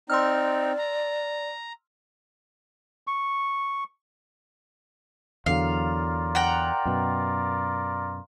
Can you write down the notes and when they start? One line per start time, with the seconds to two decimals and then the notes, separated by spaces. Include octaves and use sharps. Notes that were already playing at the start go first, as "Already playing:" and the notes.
0.10 C4 D#4 D5 C6 E6 F6
0.79 A#5
3.07 C#6
5.46 E2 D3 F#3 F4 A#4 D5 F5
6.35 F#5 G5 A#5
6.85 F#2 B2